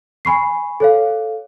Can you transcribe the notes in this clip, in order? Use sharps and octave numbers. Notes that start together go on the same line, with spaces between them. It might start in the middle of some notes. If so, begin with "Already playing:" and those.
G#5 B5 C#6 C7
A4 C#5 F5